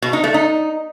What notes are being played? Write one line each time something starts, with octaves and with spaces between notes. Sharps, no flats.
B2
D#4
A3
D#4